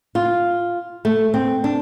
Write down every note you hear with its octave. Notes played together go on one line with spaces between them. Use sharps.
F4
A3
C4
D4